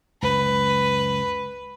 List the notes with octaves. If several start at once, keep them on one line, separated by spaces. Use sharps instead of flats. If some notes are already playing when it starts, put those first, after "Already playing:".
C#2 F#2 B4